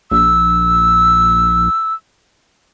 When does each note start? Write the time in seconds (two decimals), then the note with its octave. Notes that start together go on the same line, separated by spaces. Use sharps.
0.11 A#1 E6